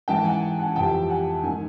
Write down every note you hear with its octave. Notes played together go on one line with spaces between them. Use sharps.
G#2 E3 G5 A5
F#5 G#5
F#5 G#5
F2 C3 E3 G5 A5
F#5 G#5
G#2 D#3 F#5 G#5